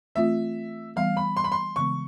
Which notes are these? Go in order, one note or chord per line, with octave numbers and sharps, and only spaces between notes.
E3 A3 C4 F4 E5
E3 G3 B3 F5
B5
C6
B5
C6
C#3 E3 G#3 B3 C#6